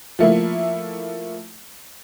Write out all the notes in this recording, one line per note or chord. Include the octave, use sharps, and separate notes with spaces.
F3 A3 A#3 E4